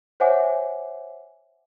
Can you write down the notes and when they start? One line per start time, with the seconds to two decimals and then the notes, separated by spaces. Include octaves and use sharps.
0.20 C5 C#5 E5 F#5 G#5 D6